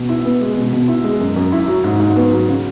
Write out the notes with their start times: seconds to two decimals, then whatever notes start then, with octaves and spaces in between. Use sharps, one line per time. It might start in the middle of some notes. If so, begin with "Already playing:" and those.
Already playing: B2
0.09 E4
0.25 B3
0.41 G#3
0.57 B2
0.73 B2
0.88 E4
1.04 G#3
1.20 F#2
1.36 F#2
1.52 E4
1.68 F#3
1.84 G#2
2.00 G#2
2.16 B3
2.32 F#3
2.48 C#3